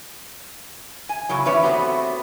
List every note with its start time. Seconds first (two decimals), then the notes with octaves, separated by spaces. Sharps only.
1.09 G#5
1.29 F#2 A2 C#3 F#3
1.46 E3 C#4 B4 C#5 D5 E5
1.63 A3 B3 C4 F#4 G4